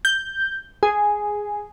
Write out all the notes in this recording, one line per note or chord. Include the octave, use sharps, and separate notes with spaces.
G6
G#4